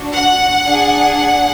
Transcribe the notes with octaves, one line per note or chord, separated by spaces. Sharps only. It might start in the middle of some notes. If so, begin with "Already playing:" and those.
Already playing: D4 F#4
F#5
D4 G#4
F#5